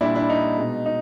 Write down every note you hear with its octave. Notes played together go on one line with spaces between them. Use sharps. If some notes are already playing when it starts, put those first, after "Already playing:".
A#2 G3 D4 E4
D4 E4
D#4
B2 G#3
D#4